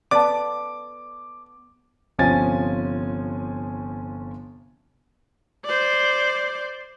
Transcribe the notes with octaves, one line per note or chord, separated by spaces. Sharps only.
B3 A4 B4 D5 F#5 A5 D6
G1 C3 F3 C#4 G#5 A6
C5 D5